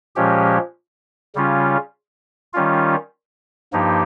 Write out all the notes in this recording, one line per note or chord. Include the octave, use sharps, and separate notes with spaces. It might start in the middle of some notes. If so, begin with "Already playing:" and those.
A#2 F3 G#3 C#4 G4
C#3 G3 C#4 F4
D#3 G3 C#4 F4
G2 F3 A#3 D#4 G4